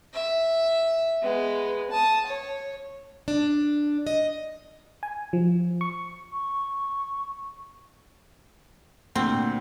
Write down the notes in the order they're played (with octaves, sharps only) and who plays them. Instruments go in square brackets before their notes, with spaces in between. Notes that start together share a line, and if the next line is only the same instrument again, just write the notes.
[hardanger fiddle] E5
G#3 B3
A5 D#6
C#5
[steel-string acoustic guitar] D4
D#5
[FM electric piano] G#5
F3
C#6
[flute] C#6
[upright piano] D2 A#2 [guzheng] C4